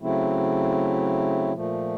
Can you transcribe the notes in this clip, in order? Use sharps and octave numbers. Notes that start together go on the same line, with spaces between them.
C#3 F#3 A3 C4 E4
A#2 F3 A3